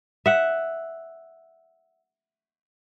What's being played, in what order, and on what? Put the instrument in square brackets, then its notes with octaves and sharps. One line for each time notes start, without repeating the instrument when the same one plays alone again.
[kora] E5 F#5